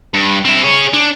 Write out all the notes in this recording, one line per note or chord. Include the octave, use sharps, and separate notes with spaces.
G2
C4 E4
G#4 C#5
D4